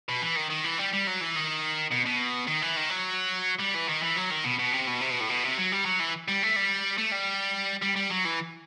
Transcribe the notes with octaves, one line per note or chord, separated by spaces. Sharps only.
B2
E3
D#3
D#3
E3
G3
G3
F#3
E3
D#3
B2
B2
D#3
E3
D#3
F#3
G3
E3
D#3
E3
F#3
D#3
B2
B2
C3
B2
C3
B2
A2
B2
C3
F#3
G3
F#3
E3
G3
A3
G3
A3
G3
G3
G3
F#3
E3